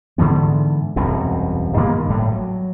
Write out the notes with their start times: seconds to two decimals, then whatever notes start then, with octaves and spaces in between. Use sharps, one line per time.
0.18 G#2 D3 E3 B3
0.96 E1 C2 F#2 B2
1.76 G2 D#3 A#3 B3
2.09 G1 A2 G3 A3
2.32 F#3